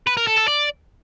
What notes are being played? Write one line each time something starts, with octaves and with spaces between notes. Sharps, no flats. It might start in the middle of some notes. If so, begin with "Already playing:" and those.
B4
A#4
A4
A4
D5